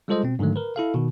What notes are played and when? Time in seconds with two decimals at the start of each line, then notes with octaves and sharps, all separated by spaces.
0.08 G3 G#3 F4 A4 C5 D#5
0.24 B2 C4
0.39 G#2 D3 D#3 F#3 A3
0.56 A#4 B4
0.76 E4 A4 F5
0.94 B2 D#3